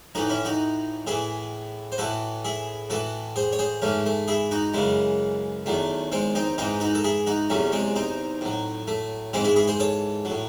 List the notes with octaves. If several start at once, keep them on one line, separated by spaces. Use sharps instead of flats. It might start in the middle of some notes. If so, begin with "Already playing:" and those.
A2 E3 D#4 F#4
C#4 E4
D#4 F#4
A2 E3 E4 G#4
C5
A2 E3 F#4 A4
E4 G#4
A2 E3 F#4 A4
G#4 C5
C#5
G#4 C5
G#2 E3 A3 C#4
A3
E4 G#4
D#4 F#4
F#2 C#3 E3 G#3
E2 D#3 F#3 A3
G#3 C4
C4 D#4
G#2 E3 C4 D#4
D#4 F#4
A4
E4 G#4
D#4 F#4
E2 C3 F#3 A3 C#4
G#3 C4
C4 D#4
A2 F#3
A3
G#2 E3 G#3 C4
E4 G#4
E4 G#4
G#4 C5
A4 C#5
F#3
A2